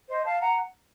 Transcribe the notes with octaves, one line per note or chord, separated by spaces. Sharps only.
C5 D#5
F5 A5
F#5 A#5